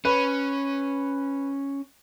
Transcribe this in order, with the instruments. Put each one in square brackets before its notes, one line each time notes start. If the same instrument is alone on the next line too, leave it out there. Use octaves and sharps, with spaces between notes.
[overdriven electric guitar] C#4 [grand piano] B4